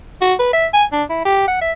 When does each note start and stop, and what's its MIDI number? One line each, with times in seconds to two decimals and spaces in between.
0.21 0.34 66
0.39 0.53 71
0.53 0.67 76
0.74 0.85 80
0.92 1.04 62
1.10 1.23 64
1.25 1.43 67
1.48 1.57 78
1.61 1.72 76